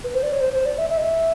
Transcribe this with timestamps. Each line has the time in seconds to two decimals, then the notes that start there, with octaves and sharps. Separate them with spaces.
0.04 B4
0.14 C5
0.23 D5
0.32 C#5
0.41 C5
0.53 C5
0.66 D5
0.78 E5
0.90 E5
0.97 D#5
1.02 E5